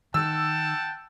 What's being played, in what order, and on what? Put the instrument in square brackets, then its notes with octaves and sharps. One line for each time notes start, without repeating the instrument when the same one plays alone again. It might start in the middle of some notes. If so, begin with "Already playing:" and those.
[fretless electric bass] D#3 [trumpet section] F#5 G5 A5 [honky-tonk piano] E6